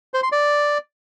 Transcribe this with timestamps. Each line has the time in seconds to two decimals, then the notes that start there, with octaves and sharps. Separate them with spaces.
0.14 C5
0.23 C6
0.32 D5